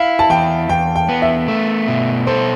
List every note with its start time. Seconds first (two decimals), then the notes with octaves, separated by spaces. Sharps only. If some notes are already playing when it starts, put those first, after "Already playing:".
Already playing: E4 F5
0.19 A5
0.30 E2 G5
0.69 E2 G5
0.96 G5
1.09 B3
1.22 E5
1.48 A3
1.88 B2
2.27 A4 C5